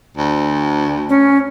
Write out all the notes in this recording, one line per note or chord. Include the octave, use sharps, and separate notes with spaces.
D2
C#4